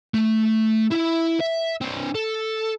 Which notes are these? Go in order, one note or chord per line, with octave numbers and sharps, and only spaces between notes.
A3
E4 E5
E5
C4 D4
A4